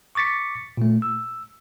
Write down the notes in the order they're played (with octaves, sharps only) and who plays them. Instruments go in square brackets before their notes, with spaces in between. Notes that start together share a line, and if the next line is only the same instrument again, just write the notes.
[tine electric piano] C#6 D6 A6 B6 C#7
A#2 A3
E6